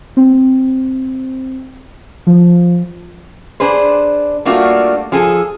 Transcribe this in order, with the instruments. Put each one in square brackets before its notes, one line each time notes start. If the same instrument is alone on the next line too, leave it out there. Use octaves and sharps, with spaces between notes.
[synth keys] C4
F3
[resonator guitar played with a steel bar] D4 G#4 B4 C5
G3 A3 A#3 D4 F4 F#4
F3 G#4 A4